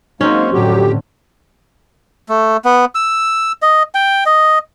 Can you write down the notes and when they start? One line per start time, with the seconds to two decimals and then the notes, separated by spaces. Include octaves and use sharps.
0.21 F#3 G#3 A#3 C4 C#4 D#4
0.53 F2 A2 D3 F#3 G4
2.29 A3
2.65 B3
2.95 E6
3.62 D#5
3.95 G5
4.26 D#5